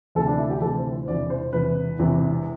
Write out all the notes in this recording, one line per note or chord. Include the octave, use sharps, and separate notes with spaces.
D2 C3 E3 A4
D4
E4
G4
D2 C3 E3 A4
C5
C5
E1 E2 C3 E3 D5
C5
E1 E2 C3 E3 B4
E1 E2 C3 E3